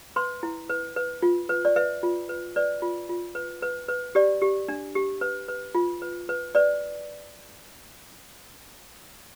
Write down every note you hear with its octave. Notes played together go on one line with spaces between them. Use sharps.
B4 C6
E4
B4
B4
F4
B4
D5
B4 E5
F4
B4
B4 D5
F4
F4
B4
B4
B4
G4 D5
G4
D4
G4
B4
B4
F4
B4
B4
B4 D5